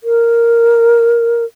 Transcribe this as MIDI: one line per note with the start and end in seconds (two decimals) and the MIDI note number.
0.04 1.44 70